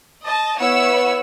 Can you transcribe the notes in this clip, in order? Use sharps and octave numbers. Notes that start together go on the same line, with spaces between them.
D#5 A5
B3 E4 C#5 F#5 E6